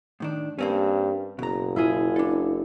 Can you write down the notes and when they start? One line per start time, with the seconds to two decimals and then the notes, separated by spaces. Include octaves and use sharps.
0.20 A2 D#3 D4
0.59 G2 A#3 C4 C#4
1.39 F#1 B2 A#5
1.76 E4 F4 G#4
2.16 D4 A4